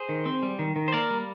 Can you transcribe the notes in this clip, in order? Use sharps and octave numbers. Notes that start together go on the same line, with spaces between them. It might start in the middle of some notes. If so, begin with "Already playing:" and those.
Already playing: G#4 C5
D#3
C4
G3
D#3
D#3
C5
A#3 A#4 D5
G3